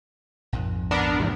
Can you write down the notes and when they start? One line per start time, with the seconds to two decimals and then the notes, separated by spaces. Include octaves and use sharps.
0.53 A#1 F2 G#2
0.91 B3 D4 A#4
1.20 E2 G#2 C3 F3